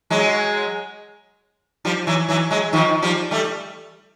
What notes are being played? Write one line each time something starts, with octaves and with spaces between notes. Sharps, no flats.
F#3 G#3
F3 G3
E3 F#3
E3 F#3
F#3 G#3
D#3 F3
F3 G3
G3 A3